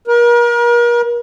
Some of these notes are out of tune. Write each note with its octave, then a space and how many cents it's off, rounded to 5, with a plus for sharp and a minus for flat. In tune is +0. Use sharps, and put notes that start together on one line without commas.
A#4 +40